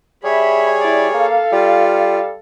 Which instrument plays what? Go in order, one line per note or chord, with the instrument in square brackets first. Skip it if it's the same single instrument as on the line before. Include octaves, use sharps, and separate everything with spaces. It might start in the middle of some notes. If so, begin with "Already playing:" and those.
[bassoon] G3 [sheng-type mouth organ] G#4 C#5 [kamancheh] E5 B5
[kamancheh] E4 D5
[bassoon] A#3 [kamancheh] A4 F5
[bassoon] G3 [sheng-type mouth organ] F4